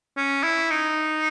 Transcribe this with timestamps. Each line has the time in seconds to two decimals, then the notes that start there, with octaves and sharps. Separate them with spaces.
0.17 C#4
0.43 E4
0.71 D#4